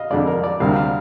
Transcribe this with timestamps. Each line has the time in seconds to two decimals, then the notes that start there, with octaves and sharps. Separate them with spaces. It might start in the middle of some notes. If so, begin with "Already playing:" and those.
Already playing: D#5 F5
0.10 F2 D3 G#3 D5
0.27 A#4
0.44 D5
0.60 D2 C3 G3 A#3 F5
0.76 F5